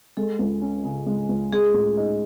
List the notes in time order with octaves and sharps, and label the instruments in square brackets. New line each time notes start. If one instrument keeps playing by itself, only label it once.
[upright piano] G#3 [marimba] A4
[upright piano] C#2
C#4
C#3
G#3
C#2
[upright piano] G#3 [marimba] G#4
[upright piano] A2
D#4